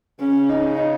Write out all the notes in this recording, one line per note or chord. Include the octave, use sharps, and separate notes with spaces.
C#3 C#4
D#4